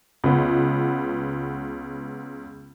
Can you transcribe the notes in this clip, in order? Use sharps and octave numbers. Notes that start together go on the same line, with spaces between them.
C#2 B3